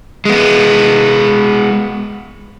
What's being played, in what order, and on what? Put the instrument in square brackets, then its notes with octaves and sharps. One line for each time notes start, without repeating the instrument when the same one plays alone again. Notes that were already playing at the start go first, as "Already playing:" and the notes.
[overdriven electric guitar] G#3 B3